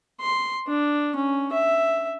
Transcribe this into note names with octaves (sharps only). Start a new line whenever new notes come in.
C6
D4
C#4
E5